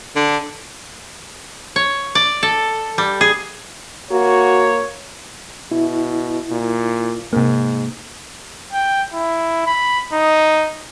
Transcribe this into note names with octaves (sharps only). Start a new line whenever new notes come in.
D3
C#5
D5
A4
G3
G#4
A#3 F#4 C#5
B2 E4
A#2
G#2 C3 A#3
G5
E4
B5
D#4